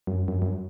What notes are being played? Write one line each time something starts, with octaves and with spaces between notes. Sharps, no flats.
F#2
F#2
F#2